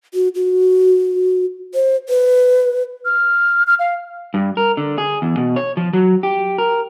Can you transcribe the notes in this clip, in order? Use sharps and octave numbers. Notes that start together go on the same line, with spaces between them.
F#4
F#4
C5
B4
F6
F6
F5
G2
A#4
D3
G#4
E2
B2
C#5
F3
F#3
G4
A#4